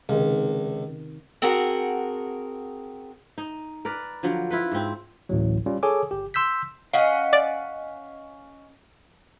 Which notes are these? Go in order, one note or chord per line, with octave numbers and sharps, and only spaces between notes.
C#2 C3 D#3
C4 F#4 G#4 A#4 F#5 A5
D#4
A#4 B4 D5
D3 F3 F#3
E4 F4 B4
G#2 C4
A1 D2 A2 F#3
G3 C#4 F4
G#4 A4 C#5 G#5 D6
G1 G4
C6 E6 G6 B6
C#4 D#5 F5 F#5
D5